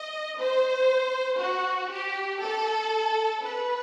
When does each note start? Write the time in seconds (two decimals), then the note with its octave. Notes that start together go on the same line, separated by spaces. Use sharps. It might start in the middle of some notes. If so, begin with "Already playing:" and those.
Already playing: D#5
0.39 C5
1.40 F#4
1.91 G4
2.42 A4
3.43 B4